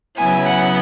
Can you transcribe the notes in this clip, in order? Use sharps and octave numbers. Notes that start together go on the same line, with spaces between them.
C#3 F#3 B3 E4 G#5
F#5